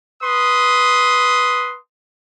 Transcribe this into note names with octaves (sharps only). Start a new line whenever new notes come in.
B4 C6 D#6